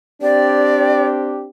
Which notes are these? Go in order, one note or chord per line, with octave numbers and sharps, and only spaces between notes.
C4 D4 G4 D5